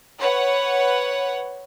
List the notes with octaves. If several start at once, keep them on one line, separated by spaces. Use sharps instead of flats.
B4 C#5 F#5